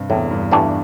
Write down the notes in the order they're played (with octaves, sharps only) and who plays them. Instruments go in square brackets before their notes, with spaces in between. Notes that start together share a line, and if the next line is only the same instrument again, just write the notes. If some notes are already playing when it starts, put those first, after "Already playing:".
Already playing: [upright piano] G2 C3
[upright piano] E2 [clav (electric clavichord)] A2
[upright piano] G2
[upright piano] G2 [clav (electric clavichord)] E3 A3 D4 G4